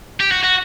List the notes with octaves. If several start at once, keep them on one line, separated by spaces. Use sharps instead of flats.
G4
F#4
F#4